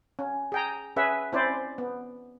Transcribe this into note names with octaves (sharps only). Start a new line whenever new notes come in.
C#4
G#4 G5 A#5
C#4 G#4 B4 E5 F#5
C4 C#4 E4 C5 D5
B3